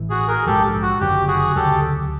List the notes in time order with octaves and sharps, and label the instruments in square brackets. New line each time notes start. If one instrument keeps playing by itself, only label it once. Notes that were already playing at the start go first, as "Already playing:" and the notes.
Already playing: [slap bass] A1 A2 E3
[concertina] F#4 G#4
G#4 A#4
[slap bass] A#1 G#2 F3 G#3 [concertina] G4 A4
[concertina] F#4
[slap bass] F#1 F#2 D3 F#3 [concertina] G4
[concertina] F#4 G#4
[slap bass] D2 C#3 F#3 [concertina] G4 A4